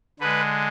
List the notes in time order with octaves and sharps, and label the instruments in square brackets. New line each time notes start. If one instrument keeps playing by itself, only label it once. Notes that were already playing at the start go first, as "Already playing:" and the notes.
[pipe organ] D3 G#3 B4